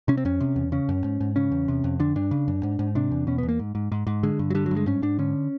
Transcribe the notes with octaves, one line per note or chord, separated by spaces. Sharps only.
C3 C#4
C4
F2 C#4
C3
E2
C#3 C#4
F#2
G#2
G#2
C#3 C#4
E2
C3
F2
D3 D4
G2 D4
C#3
F#2
G#2
G#2
C3 D4
E2
B2 C#4
B3
E2
A#3
G#2
G#2
G#2
G#2
D3 G#3
G2
F#3
D3 G3
F#3
G2
G#3
G#2 C#4
G#2 D4
D3 C#4